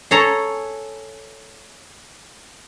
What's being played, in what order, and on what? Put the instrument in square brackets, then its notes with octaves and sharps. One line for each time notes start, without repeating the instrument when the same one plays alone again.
[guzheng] G#4 A4 C#5 A#5